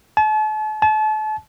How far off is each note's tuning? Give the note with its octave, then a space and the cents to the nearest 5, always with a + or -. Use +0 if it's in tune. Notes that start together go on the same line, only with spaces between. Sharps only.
A5 -40
A5 -35